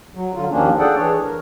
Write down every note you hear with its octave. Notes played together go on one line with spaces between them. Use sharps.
F#3
D3 F#3 F4
D#2 D#3 F3 A#3 C#4 D4
G#4 A4 D5 F#5 G5
E3 D4 G#4 C#5
A#4